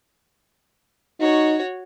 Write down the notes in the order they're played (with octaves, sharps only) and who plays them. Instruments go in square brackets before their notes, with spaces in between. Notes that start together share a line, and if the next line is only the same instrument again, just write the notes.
[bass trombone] D#4 [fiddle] F#4 C#5